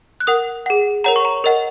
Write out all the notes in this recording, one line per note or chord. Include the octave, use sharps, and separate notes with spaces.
F#6
A#4 F#5 D#6
G#4 F#5
A#4 C#5 F#5 A#5
C#6
A#5
A#4 D#5 F#5